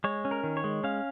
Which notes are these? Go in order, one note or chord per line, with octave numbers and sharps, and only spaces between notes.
G#3 C#5
C#4
A#4
D#3
C#5
G#3
C#4 F5